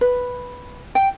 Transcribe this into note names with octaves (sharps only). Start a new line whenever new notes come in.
B4
G5